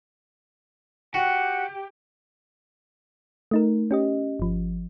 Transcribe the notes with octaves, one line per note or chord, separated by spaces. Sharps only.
F#4 G4 F#5
A3 D#4 A#4
C#4 G4 D#5
G1 F3